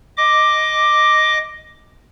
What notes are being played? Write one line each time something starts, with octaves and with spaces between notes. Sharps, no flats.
D#5 D6